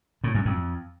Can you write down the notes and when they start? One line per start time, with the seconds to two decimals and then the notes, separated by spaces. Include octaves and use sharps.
0.24 A2
0.34 F#2
0.45 F2